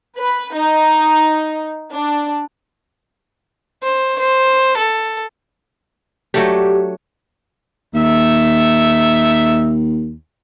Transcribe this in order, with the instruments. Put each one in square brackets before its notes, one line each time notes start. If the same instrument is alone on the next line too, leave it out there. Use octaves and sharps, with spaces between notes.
[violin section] B4
D#4
D4
[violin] C5
C5
A4
[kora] F#3 A3 D4 [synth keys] G4
[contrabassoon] D#2 [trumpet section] D#4 E5